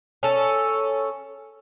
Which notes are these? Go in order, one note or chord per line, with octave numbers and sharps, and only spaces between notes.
C#4 A4